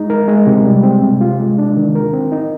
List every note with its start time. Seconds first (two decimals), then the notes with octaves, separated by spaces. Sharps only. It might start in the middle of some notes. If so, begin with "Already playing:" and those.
Already playing: G#3 D#4
0.10 A#4
0.28 G#3
0.47 C3
0.66 G3
0.83 C4
1.02 C3
1.21 F4
1.40 G#3
1.58 D4
1.77 D#3
1.95 A#4
2.13 C4
2.32 D#4